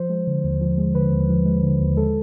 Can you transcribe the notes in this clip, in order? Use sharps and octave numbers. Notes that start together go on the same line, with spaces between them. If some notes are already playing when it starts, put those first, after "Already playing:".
Already playing: F3 C5
G#3
D3
D#2
F3
G#3
D3 B4
D#2
F3
G#3
D3
D#2
G#3 A4